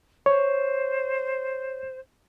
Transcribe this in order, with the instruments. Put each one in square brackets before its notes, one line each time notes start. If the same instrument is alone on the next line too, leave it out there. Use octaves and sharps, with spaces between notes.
[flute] C5 [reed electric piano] C#5